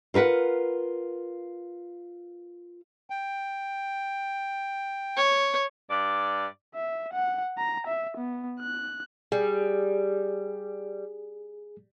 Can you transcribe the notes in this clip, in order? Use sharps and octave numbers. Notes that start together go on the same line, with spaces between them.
F4 A#4 B4 F#5
G5
C#5
G2 D5
E5
F#5
A#5
E5
B3
F#6
G3 G#4